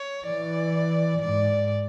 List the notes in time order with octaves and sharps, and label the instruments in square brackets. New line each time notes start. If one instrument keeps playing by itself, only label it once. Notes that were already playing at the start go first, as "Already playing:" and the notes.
Already playing: [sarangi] C#5
[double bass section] E3 [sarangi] D5
[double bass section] G#2 [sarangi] D5